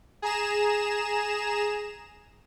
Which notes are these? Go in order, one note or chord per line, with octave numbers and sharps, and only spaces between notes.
G#4 A#5 E7